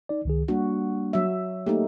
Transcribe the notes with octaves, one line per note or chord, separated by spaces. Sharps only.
D#4 D5
C#2 D#3 G#4
G3 A#3 D4 F#4
F#3 E5
A3 A#3 D#4 G4